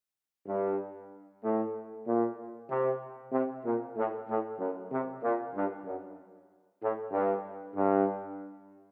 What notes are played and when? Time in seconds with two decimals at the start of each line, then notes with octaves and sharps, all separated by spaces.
0.47 G2
1.42 A2
2.06 A#2
2.69 C3
3.32 C3
3.64 A#2
3.95 A2
4.27 A2
4.59 F#2
4.90 C3
5.21 A#2
5.54 G2
5.85 F#2
6.80 A2
7.11 G2
7.74 G2